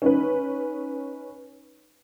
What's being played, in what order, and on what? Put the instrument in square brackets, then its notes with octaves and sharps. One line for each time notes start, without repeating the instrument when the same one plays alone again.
[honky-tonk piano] C#4 D#4 B4